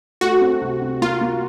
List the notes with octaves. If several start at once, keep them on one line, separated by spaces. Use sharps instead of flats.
A3 F#4
C4
C3
C3
A#3 F4
A#3